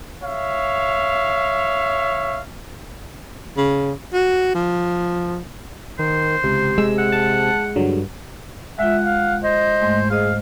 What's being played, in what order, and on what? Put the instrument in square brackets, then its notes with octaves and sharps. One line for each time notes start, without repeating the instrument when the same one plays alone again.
[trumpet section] C#5 E5 F5
[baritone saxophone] C#3
F#4
F3
[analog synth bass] D#3 [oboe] C5
[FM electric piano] C#2 [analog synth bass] C3
[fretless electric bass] G#3 [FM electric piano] E6
[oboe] F#5
[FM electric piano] A5
[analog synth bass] G2 [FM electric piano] D3 F#3
[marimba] G#3 F4 [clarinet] E5 [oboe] F#5
[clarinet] F5
[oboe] C5 [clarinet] D#5
[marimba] G#2 G#3 A3
[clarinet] G#4 [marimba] C5 D#5 [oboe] F5